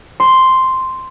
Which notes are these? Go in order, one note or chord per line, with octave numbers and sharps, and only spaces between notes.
C6